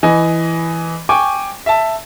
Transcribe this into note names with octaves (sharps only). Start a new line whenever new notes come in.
E3 D#5 G#5
G5 G#5 C#6 D6
E5 A5